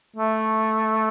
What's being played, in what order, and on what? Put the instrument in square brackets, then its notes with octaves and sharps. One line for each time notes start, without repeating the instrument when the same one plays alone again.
[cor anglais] A3